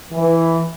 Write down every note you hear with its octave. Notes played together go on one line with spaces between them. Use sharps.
E3